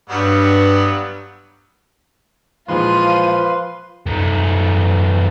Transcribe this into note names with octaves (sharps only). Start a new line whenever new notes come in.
G2 F#3 G3 B3
A#2 E3 F3 G#3 F4 B4 C6 D#7
F#2 A3